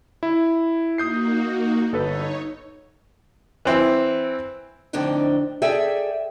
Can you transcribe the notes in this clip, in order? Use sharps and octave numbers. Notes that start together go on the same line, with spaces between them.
E4
A#3 D#4 F#4 D#6 G6 C7
G1 D#4 A4 B4 C#5
E3 C4 E4
F2 A2 D3 C4 D4 D#4
G#4 A4 D5 E5 G5 G#5